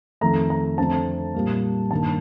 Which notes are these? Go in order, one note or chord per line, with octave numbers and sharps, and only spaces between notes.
F2 D#3 A3 A#5
A#5
F2 D3 A3 C4 A5
A#2 G3 A#3
G2 D#3 A#3 A5